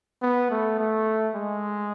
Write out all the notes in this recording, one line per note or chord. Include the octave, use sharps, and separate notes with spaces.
B3
A3
A3
G#3